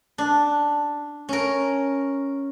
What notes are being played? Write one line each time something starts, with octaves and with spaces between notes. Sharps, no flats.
D4
C#4 A#4